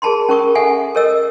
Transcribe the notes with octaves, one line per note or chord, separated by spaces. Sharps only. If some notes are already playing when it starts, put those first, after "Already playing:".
G#4 A#4 A5 B5 C6
C#4 A#4 C#6 D#6
A4 E5 F#5 G#5
A4 A#4 C#5 D#5 E6